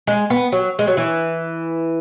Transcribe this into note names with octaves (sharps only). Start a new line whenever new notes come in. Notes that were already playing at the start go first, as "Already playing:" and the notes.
G#3
B3
F#3
G#3
F#3
E3